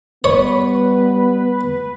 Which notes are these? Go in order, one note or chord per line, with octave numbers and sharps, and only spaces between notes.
G3 B3 B4 C#5